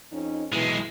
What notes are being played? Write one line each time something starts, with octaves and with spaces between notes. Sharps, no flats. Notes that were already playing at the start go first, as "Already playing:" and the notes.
F2 C#4 D#4
B1 B2 E3 G#3